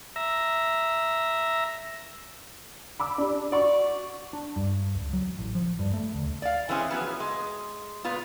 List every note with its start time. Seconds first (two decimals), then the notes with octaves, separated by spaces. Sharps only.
0.16 E5 A#5
3.00 B5 D6 E6
3.18 D4 G4
3.52 F#4 D5 C#6
4.33 D4
4.56 G2
4.95 C#2
5.13 F#3
5.39 A1
5.55 F3
5.79 G2
5.93 A3
6.14 D2
6.42 D5 F5
6.69 E3 G#3 C4 C#4 G#4
6.91 F3 F#3 B3
7.20 G#3
8.04 A#2 B3 F4